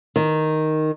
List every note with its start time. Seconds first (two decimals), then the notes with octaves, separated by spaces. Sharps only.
0.16 D#3